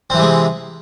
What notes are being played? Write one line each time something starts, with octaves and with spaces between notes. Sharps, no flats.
C3 E3 G#3 C4